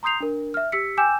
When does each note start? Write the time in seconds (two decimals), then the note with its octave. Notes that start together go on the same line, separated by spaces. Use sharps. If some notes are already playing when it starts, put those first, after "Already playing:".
0.03 A#5 C6 D#6 G6 C7 F7
0.20 D4 A#4
0.54 E5 F6
0.72 G4 E6 B6 C#7
0.97 G5 G#5 D6 E6 G6 E7